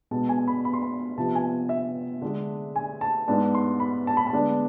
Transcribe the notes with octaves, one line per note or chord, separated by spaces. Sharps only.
B2 G#3 B3 A5
G#5
B5
B5
C6
B5
C3 F3 B3 A5
G#5
E5
D3 G#3 D4
G#5
A5
G#2 G#3 B3 D4 A5
C6
B5
A5
B5
A5
D3 G#3 B3 D4